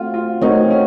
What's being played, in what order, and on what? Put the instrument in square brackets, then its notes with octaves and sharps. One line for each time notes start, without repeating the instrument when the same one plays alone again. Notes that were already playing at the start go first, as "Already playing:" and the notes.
Already playing: [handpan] A3 C4 F#4 [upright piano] F4
[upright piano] F4
[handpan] A3 C4 F#4 A#4 C#5 [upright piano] D#4
[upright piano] C#4